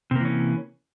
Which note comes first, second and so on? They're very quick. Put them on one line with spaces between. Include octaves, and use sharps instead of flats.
C3 A#3 E3 C#4